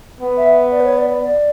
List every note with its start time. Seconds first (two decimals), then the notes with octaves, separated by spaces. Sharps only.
0.21 B3
0.37 E5
0.71 D5
0.80 B4
0.84 C#5
0.97 D5
1.10 D5
1.22 D5